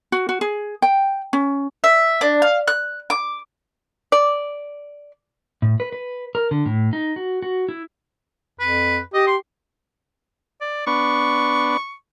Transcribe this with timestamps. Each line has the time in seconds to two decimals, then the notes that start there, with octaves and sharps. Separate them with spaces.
0.12 F#4
0.29 F#4
0.41 G#4
0.82 G5
1.33 C#4
1.84 E5
2.21 D4
2.42 F5
2.67 F#6
3.10 D6
4.12 D5
5.62 A2
5.80 B4
5.93 B4
6.35 A#4
6.51 D3
6.66 A2
6.93 D#4
7.16 F#4
7.42 F#4
7.69 E4
8.60 F2 B4
9.14 G4 D#5
9.27 C6
10.61 D5
10.87 B3 D4 C#6